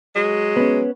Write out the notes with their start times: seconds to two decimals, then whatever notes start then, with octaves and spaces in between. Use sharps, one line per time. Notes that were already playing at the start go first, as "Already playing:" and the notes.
0.15 F#3 G#3
0.56 B3 C#4